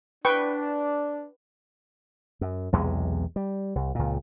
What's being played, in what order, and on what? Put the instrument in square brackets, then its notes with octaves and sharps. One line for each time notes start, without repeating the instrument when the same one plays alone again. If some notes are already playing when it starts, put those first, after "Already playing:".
[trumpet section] D4 [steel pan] B4 G5 C#6
[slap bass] F#2
B1 E2 C3 G#3
G3
C2
C#2 A#2